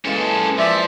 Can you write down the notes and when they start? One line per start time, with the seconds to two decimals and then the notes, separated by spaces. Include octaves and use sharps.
0.05 E3 G#3 A#3 C#4 A4
0.59 F3 D5 E5